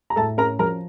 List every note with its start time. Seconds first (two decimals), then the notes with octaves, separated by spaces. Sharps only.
0.10 A#5
0.16 A2 A4 A5
0.37 C#4 A#4 A#5
0.59 F3 A#4 A#5